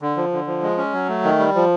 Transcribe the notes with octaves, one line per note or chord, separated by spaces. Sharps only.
D3
F3
D3
F3
G#3
C#4
F#3
A3
D#3
G3
F3